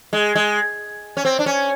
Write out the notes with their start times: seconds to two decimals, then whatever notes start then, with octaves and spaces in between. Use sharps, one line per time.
0.13 G#3
0.35 G#3
1.17 C#4
1.25 C4
1.39 D4
1.46 C#4